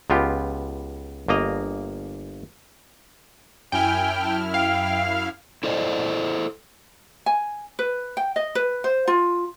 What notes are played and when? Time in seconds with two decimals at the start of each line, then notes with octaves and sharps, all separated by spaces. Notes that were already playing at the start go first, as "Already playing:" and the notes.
0.10 C#2 B3 F4 G4
1.28 G1 A#3 D#5 A#5
3.72 F#2 E4 G5 G#5 F6
4.21 A5
4.54 F5 G5
5.63 E4 A4 C5 D5 D#5
7.26 G#5
7.79 B4
8.17 G5
8.36 D#5
8.55 B4
8.84 C5
9.07 F4